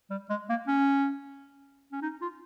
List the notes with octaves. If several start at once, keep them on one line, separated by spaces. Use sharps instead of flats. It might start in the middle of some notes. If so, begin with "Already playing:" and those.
G3
G#3
A#3
C#4
C#4
D#4
F4